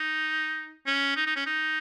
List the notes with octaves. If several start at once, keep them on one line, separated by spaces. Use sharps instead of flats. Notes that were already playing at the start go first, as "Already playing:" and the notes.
Already playing: D#4
C#4
D#4
D#4
C#4
D#4